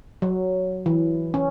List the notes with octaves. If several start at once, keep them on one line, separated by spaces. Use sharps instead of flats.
F#3
E3
C#4